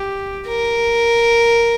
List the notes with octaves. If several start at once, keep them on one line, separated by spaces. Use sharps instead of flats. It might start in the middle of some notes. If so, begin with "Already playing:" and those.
Already playing: G4
A#4